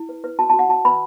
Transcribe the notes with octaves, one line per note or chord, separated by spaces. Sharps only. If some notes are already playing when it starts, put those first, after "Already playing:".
Already playing: E4
B4
B4
F#4 A5
A5
F#4
F#5
F#4 A5
B4 B5